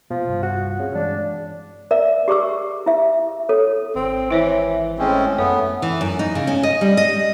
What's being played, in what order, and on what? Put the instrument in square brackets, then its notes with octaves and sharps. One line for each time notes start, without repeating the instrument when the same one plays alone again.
[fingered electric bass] B2 B3 [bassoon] F3
[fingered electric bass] C2 G2
[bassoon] F#4
[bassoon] C#3 [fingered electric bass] C4
[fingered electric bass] G2 E3 G#3 [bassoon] D4
[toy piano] A#4 D5 E5
G4 G#4 D5 C#6 E6
E4 E5
A4 C#5
[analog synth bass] G#1 [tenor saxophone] C4
[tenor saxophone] E3 [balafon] E4 C5 C#5
[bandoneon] A2 C4 C#4 [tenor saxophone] G#3
[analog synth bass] F#2 [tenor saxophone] A3 [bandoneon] B3 [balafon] C#5
[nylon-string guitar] E3
F#2
D#4
C#3
C#4
D#5
G3
D#5